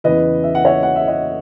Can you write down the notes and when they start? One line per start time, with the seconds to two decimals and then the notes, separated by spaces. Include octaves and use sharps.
0.04 E2 C#3 E3 B4 D#5
0.43 E5
0.55 F#5
0.65 C#5 E5
0.83 F#5
0.96 E5
1.08 D#5 F#5